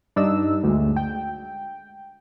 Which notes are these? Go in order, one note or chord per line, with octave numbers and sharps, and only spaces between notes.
G2 D4 D#4 E6
D2 G#3
G5